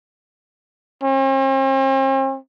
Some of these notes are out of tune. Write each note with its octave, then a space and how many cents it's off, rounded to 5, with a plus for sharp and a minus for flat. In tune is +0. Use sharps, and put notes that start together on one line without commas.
C4 +45